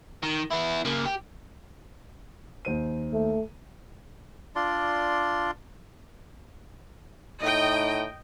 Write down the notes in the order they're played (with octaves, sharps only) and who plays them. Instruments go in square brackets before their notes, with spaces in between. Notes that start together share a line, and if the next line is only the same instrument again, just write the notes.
[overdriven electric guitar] D#3
B3 E4
C#3 A#3
G4
[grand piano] D#2 C5 D#7
[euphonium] A3
[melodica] D4 F4 D5 C6
[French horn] A2 [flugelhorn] D#4 [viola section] D#5 G5